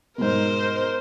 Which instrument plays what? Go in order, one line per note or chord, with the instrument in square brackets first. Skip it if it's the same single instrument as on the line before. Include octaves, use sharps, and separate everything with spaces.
[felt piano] G#2 B2 [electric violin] A#4 C5